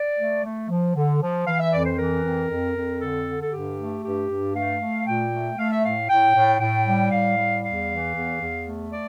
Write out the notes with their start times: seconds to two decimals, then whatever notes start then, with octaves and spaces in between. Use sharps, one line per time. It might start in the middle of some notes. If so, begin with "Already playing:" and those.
Already playing: D5
0.19 A3
0.44 A3
0.69 F3
0.95 D3
1.21 F3
1.47 E3 F5
1.60 E5
1.72 F2 D5
1.85 C5
1.98 E3 A#4
2.24 F2
2.49 F2
2.76 F2
3.01 D3 A4
3.27 D3
3.41 A4
3.52 G2 G4
3.78 A3
4.03 G2 G4
4.29 G2
4.55 A3 F5
4.81 A3
5.06 A#2 G5
5.32 A3
5.57 A3 F5
5.71 E5
5.83 A2 F5
6.09 A2 G5
6.35 A2
6.60 A2 G5
6.86 G3
7.12 A2 F5
7.37 G3
7.63 E2 F5
7.89 E3
8.15 E2
8.40 E2
8.66 A3
8.91 D5